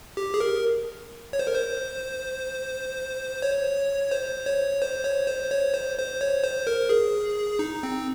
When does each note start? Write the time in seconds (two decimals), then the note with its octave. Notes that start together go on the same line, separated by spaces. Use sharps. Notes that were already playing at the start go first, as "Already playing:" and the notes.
0.17 G4
0.34 G#4
0.40 A#4
1.33 C#5
1.39 C5
1.47 A#4
1.54 C5
3.42 C#5
4.11 C5
4.46 C#5
4.82 C5
5.04 C#5
5.27 C5
5.51 C#5
5.74 C5
5.98 C5
6.21 C#5
6.44 C5
6.67 A#4
6.89 G#4
7.59 D#4
7.83 C4